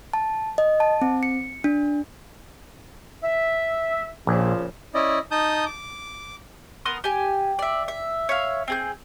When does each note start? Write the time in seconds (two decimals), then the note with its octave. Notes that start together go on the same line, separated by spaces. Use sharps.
0.13 A5
0.58 D#5
0.80 A5
1.02 C4
1.23 C#7
1.64 D4
3.22 E5
4.27 A#1 A#2 C#3 F3
4.94 C#4 E4 D5 D#5
5.31 D#4 A5 D#6 G6
5.66 D6
6.85 B3 A#4 C6 D#6
7.04 G4 G#5
7.59 D5 E5
7.88 E5
8.29 C#5 E5 F5
8.68 C4 G#4 G6